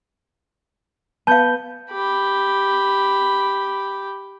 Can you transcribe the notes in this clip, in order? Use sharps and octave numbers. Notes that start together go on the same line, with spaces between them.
B3 F5 A5 G6
G4 B5